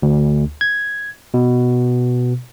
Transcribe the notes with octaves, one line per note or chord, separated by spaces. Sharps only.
D2
G#6
B2